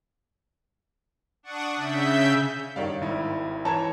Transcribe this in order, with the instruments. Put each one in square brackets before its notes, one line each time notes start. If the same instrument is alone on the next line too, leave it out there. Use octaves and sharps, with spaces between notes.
[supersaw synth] D4 F#5 C#6 D#6
C#3 E5 G6
[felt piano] G2 D#3 [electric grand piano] C#5 D5 F5
[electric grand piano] G#1 E4
[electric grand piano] E3 C#5 [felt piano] A5 A#5 G#6